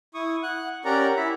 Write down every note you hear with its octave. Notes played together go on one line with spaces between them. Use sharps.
E4 C#6 D#6
F#5 F#6
C#4 G4 A#4 D5 F#5 A#5
E4 E5 B5